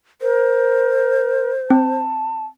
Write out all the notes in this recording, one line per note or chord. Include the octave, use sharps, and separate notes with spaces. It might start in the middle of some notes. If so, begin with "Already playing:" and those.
A#4 C5
C4 A5